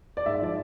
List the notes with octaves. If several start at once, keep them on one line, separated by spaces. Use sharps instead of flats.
D5
G#2 E5
F3 D5